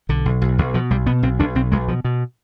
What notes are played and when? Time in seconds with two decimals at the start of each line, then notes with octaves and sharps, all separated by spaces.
0.09 B1 D3
0.25 B1
0.42 B1
0.58 B1
0.74 B2 F3
0.91 B1 G3
1.06 B2 B3
1.23 B1 C4
1.40 B1 D4
1.55 B1 C4
1.72 B1 G#3
1.88 B2 F3
2.04 B2